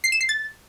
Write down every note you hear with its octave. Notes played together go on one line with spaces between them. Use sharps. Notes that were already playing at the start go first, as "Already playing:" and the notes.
C7
E7
C7
A6